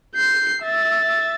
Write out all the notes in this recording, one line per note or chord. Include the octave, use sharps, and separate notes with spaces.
G6 C7
E5 A6